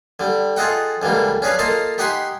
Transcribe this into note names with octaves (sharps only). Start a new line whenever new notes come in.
D3 G3
F4 G#4 A4 D#5 F#5 G5
C#2 D3 E3 G3 A#3
C#4 D4 G#4 B4 F5
A#3 F4 A4 D#5 F5 A5
D#4 G4 F#5 G#5 B5 C6